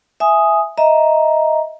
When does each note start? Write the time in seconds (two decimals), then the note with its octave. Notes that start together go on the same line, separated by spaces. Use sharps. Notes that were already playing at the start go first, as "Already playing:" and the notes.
0.20 E5 G#5 D#6
0.77 D#5 E5 A#5